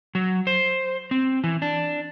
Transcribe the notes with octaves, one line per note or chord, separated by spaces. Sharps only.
F#3
C5
C4
E3
D4